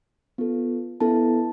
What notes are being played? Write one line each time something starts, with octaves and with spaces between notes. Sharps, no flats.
B3 F4 A4
B3 E4 A4 A5